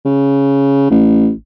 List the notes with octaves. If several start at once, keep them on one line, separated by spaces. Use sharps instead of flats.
C#3
A1